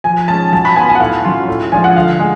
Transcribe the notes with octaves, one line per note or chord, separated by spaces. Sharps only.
F3 G#5
G#3 C#4 A5
F#3 A5
B5
B3 F4 G#5
G#5
F#5
A2 F5
F#3 C#4 F4
A2
F3 G#3 D4 F4 G#5
F#5
D3 F5
G#3